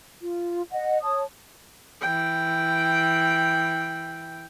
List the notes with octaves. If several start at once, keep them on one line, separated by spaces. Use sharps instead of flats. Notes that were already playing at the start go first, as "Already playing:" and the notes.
F4
D#5 F#5
C#5 A5 D#6
E3 G5